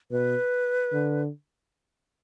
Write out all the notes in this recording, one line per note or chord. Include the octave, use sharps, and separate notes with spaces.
B2 B4
D3